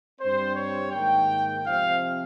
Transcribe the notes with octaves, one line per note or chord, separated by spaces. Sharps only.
G2 G3 C4 C5
C#5
G#2 D#3 A#3 G5
C3 F3 C4 F5